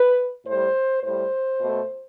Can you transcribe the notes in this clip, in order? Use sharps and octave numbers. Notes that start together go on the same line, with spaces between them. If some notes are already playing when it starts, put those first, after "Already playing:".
Already playing: B4
A2 G3 C5
A2 G3 C5
B2 A3